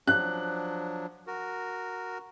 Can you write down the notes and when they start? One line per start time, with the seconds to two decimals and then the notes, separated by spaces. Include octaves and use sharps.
0.07 F3 F#3 D4 F#6
1.27 F#4 A#4